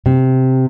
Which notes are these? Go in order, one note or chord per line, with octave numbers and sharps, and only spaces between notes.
C3